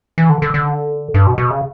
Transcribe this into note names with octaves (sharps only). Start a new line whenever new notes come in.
E3
D3
D3
D3
G2
B2
B2
C#3